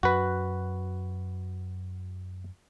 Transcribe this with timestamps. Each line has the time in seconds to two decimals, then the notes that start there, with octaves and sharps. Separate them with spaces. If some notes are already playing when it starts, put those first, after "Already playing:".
0.03 F#2 F#4 B4